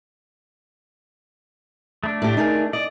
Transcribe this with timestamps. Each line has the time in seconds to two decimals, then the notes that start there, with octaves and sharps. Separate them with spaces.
2.04 A3 D4
2.22 A2 G4
2.37 D#4 G#4 A#4
2.73 D5 D#5